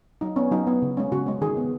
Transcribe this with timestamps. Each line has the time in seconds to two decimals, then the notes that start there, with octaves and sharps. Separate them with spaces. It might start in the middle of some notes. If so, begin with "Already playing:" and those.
0.21 F#3 D#4
0.36 B3 C#4
0.51 F#3 D#4
0.67 B3
0.82 C#3
0.97 G#3 C#4
1.12 C#3 F#4
1.26 G#3 C#4
1.41 D#3 G#4
1.57 B3